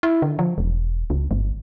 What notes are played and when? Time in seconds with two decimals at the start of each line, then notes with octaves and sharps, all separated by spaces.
0.03 E4
0.22 D3
0.39 F3
0.58 E1
1.10 C#2
1.31 G1